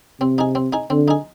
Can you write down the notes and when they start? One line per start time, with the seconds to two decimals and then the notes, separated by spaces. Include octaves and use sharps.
0.21 C3 C4
0.38 D#4 G#4
0.55 C4
0.73 D#4 G#4
0.90 D3 C4
1.08 D#4 G#4